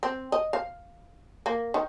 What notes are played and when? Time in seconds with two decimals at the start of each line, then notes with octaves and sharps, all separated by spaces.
0.03 C4
0.32 D#5
0.53 F5
1.46 A#3
1.74 D#3